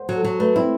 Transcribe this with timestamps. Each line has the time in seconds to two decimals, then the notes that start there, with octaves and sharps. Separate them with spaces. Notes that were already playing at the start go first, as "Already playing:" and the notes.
Already playing: C5 F#5
0.09 F#3
0.15 A4
0.25 F#3
0.39 A3 B4
0.55 C4 E4